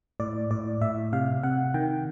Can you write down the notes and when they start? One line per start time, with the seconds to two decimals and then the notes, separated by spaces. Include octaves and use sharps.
0.20 A2 D5
0.51 A2 D5
0.81 A2 E5
1.13 C3 F5
1.43 C3 F#5
1.74 D#3 G5